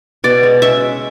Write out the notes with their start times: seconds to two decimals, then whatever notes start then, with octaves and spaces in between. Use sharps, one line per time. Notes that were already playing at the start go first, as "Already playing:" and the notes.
0.24 B2 D5
0.43 G#3
0.62 C#4 E5